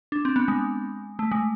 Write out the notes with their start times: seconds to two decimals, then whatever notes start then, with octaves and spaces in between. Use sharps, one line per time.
0.12 D4
0.25 C4
0.36 B3
0.48 G#3
1.19 A3
1.32 G#3